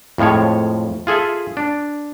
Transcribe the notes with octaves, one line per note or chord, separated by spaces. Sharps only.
F2 A2 F3 G#3 C#5
F4 G#4 A4 E5
D4